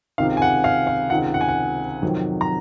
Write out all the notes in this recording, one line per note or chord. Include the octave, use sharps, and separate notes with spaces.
C#2 C3 D#3 F5
G#5
F#5
F5 G#5
F5
C#2 C3 D#3 F#5
F#5
G#5
F#5
F2 C3 D#3 F#3
A#5